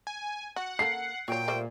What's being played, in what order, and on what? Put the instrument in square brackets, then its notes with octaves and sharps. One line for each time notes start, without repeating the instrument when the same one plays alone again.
[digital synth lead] G#5
[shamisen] F#4 [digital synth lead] F#5
[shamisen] A#3 A4 F5 [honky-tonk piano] C7
[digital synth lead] A#2 [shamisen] F#3 C#5 [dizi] G5
[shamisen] G3 A3 C5